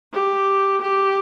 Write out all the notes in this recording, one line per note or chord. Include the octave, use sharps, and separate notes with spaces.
G4
G4